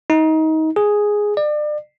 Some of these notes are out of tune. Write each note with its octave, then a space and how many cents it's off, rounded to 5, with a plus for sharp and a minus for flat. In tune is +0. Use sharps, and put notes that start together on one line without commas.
D#4 +25
G#4 +0
D5 +35